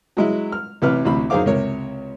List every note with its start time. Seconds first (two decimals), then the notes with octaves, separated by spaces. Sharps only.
0.17 F#3 G#3 E4
0.52 F6
0.82 A1 C3 B4 F6
1.05 A1 D2 C3 B5
1.30 F#2 D#3 G#4 C5 F5 D6
1.46 C#2 C3 A#4 C#5